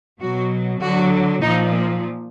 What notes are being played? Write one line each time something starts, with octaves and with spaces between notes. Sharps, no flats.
B2 F#3 F#4
D3 F#3 F#4
A#2 F3 D#4
A#3